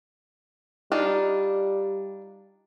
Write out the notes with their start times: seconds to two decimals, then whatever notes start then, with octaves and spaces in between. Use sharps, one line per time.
0.92 G3 D4 D#4 F4